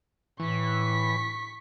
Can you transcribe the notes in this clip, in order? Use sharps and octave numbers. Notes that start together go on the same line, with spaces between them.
A2 E3 C#6 B6